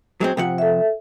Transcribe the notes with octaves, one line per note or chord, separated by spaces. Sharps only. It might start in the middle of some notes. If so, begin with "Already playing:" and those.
F#3 G#3 C4
C3 F3 F#5
A4 E5